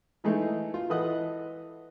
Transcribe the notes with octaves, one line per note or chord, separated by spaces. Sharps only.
E3 G#3 A3 D#4
F4
E3 A4 B4 D#5 F#5 D#6